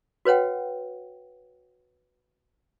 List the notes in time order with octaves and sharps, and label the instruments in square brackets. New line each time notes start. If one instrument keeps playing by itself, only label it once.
[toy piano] F#4 B4 C#5 F#5 G5